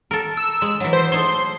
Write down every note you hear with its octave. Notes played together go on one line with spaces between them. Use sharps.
A4 A#4
E6
G#3
E3 F#3
C5
A3 D#4 C#5 C6